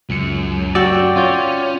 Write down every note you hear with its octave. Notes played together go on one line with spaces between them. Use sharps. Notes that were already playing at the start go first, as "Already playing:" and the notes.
C#2 F#2 C#7
F#4 D5 G5 E6
C#4 F4 C#5 G6